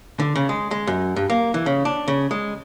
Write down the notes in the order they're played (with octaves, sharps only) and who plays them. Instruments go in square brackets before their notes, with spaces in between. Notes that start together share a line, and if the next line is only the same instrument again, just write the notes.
[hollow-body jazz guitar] D3
C#3
G#3
G#3
F#2
G2
A#3
E3
C#3
D4
C#3
G#3